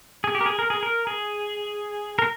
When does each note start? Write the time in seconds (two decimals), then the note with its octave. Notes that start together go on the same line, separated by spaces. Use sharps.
0.24 G#4
0.35 G4
0.41 A#4
0.46 G#4
0.59 A#4
0.70 G#4
0.83 A#4
1.07 G#4
2.19 A#4